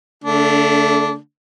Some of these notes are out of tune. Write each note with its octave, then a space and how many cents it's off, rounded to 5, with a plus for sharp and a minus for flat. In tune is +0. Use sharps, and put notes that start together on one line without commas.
D3 -45 A3 +20 D4 -15